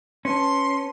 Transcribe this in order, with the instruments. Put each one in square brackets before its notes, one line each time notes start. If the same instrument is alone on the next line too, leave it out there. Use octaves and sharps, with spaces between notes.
[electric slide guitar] C#4 [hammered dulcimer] B4 A5 [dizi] C6